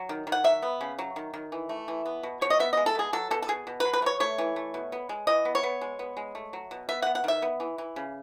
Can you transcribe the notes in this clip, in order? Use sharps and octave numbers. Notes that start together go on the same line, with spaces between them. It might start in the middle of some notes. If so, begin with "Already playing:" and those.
Already playing: F#3
D#3
D#3
F#5
F#3 E5
B3
C#3
F#3
D#3
D#3
E3
A3
E3
B3
B2
B2 C#5
D#5
B3 E5
G#3 D#5
A4
B2 G#4
F#3 A4
B2 A4
A4
B2 G#4
B2
B4
F#3
B4
A3
C#5
A3 C#5
E3
A3
B2
B3
G#3
E3 D#5
B3
C#5
B3
G#3
B3
G#3
A3
F#3
B2
B3 E5
F#5
B3
F#5
D#3 E5
B3
E3
E3
C#3